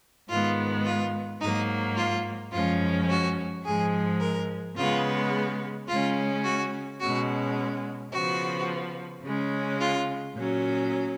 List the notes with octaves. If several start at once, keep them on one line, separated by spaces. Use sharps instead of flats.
G#2 D#3 G#3 B3 F4
F4
G#2 F#3 A#3 D#4
F4
F#2 F3 G#3 C#4 F4
F#4
G#2 F3 G#3 G#4
A#4
C#3 G#3 B3 F4
C#3 G#3 C#4 F4
F#4
B2 G#3 C#4 F#4
C#3 F3 B3 F#4
C#3 G#3 C#4
F4
A#2 F#3 C#4